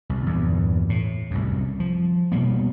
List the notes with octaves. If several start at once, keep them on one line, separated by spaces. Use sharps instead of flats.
C2
E2 G2 A#2
A2
C2 F#2
F3
B2 G3 A#3 B3